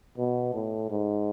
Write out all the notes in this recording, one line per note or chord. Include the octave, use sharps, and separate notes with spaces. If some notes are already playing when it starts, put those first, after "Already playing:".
B2
A2
G#2